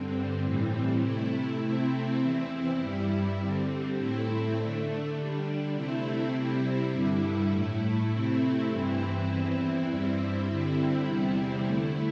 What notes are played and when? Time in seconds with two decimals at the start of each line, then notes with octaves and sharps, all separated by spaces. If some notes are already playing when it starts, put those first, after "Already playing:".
Already playing: G2 D3 C4
0.44 A2 E3 G3 C4
1.02 C3 A3 E4
1.61 C3 A3 C4 E4
2.21 E2 E3 C4 E4
2.79 G2 G3 E4
3.39 D3 G3 C4
3.98 A2 A3 C4 E4
4.57 D3 A3 D4
5.16 D3 G3 D4
5.75 C3 A3 C4 E4
6.34 C3 G3 C4 E4
6.93 G2 D3 G3 E4
7.52 A2 A3 E4
8.11 C3 A3 C4 E4
8.70 G2 E3 C4 E4
9.29 E2 E3 C4 E4
9.89 G2 G3 C4 E4
10.47 D3 G3 C4 E4
11.07 E2 C3 G3 C4 E4
11.66 D3 A3 E4